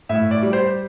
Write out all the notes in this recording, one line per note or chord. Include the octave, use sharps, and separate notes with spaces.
A2 E5
D5
G3
C5